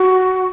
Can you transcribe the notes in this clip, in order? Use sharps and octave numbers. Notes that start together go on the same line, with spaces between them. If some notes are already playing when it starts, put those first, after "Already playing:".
Already playing: F#4